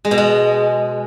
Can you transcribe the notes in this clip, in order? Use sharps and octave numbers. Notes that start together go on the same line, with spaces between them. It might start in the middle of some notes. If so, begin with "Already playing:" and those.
G#3
B2
G#3